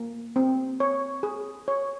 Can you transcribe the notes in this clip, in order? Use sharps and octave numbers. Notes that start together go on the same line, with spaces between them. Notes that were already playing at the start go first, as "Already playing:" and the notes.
Already playing: A#3
C4
C#5
G#4
C#5